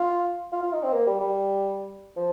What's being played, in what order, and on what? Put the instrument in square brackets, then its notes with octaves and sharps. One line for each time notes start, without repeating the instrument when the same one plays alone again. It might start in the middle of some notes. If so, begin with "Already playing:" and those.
Already playing: [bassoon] F4
F4
F4
D#4
C4
A#3
G3
G3
F3